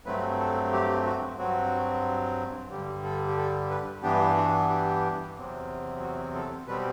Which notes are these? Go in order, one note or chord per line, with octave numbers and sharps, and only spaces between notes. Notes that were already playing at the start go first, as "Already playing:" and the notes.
G2 F#3 A3 C4 B4
A4
G4
F#4
G2 F#3 C4 F#4
G2 D3 G3 G4
A4
G4
A4
B4
G2 E3 B3 D4 G4
F#4
G4
E2 C3 F#3 C4
F#4
A4
B2 G3 C4 B4